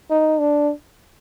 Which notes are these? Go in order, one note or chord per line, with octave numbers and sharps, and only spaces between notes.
D#4
D4